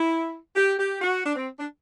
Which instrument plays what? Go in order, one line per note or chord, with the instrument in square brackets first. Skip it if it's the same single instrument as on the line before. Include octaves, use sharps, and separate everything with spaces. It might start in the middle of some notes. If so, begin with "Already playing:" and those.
Already playing: [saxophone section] E4
G4
G4
F#4
D4
C4
D4